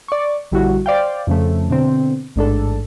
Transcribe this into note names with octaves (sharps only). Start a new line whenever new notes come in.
D5 C#6
A#1 D3 G3 E4 F#4
C5 D5 F5 G5
F2 C#3 F3 A3
B2 D3 C4
A1 G#2 D4 A4